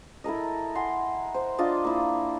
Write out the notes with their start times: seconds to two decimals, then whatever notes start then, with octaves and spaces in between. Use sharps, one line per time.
0.24 E4 A4 A#4 D#5
0.75 F#5 G#5 C6
1.34 C5
1.58 D4 F4 D5 D#5
1.84 A#3 E4